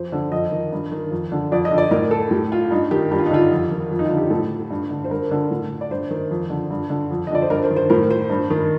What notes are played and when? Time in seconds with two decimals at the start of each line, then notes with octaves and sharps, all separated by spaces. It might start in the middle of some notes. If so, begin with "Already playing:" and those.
Already playing: F2 C5
0.12 D3
0.32 F2 D#5
0.52 D#3
0.72 G2
0.92 D#3
1.11 F2
1.32 D3
1.52 F2 D5
1.65 D#5
1.71 D3
1.78 D5
1.91 A2 A#4
2.11 A4
2.31 A2 G4
2.52 F4
2.71 G2 D#4
2.91 D#3 G4
3.11 G2 G4
3.19 F4
3.26 D#4
3.31 D3 F4
3.51 F2
3.71 D#3
3.91 F2
3.99 D#4
4.05 F4
4.10 D3
4.17 G4
4.30 A2 A4
4.71 G2
4.90 D3
5.04 C5
5.10 G2 A#4
5.31 D3
5.51 A2
5.81 D5
5.91 G2 C5
6.11 D#3
6.31 F2
6.50 D3
6.70 G2
6.90 D3
7.11 F2
7.27 D#5
7.31 D3 D5
7.42 C5
7.50 G2 A#4
7.64 C5
7.70 D#3
7.76 C5
7.90 A2 A#4
8.10 C5
8.30 G2
8.50 D#3